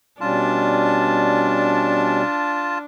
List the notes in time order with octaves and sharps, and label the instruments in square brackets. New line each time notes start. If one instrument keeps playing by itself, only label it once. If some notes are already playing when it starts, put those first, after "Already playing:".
[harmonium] B2 G3 C#4 [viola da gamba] D4 [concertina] F4 A5